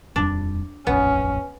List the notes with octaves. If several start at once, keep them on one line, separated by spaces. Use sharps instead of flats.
D#1 F2 G3 D4
D#1 A1 F2 B3 C#4